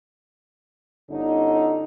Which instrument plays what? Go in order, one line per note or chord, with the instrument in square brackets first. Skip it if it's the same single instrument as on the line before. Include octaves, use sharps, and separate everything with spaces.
[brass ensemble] G1 D3 C#4 D#4